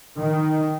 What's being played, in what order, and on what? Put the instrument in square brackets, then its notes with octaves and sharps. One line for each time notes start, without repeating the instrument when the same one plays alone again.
[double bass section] D#3